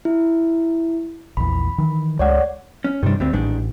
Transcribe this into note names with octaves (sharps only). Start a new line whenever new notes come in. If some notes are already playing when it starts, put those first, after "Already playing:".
E4
A#1 E2 B5
D#3 E3
C#2 G#3 C#5 D5 F#5
C#4
G2 C3 D#3 G3 D4
D2 G2 G3 C4
A1 G#2 D#3 D4